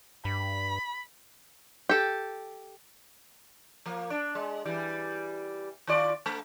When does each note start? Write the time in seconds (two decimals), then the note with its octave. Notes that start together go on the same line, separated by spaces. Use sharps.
0.25 G2 B5
1.89 G4 A4
3.86 F3 A#3
4.10 D4
4.35 G#3
4.65 E3 G3
5.87 D#3 F4 D5
6.26 A3